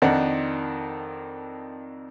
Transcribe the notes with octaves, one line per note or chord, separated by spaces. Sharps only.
F2 D#3 D4 D#4 F#5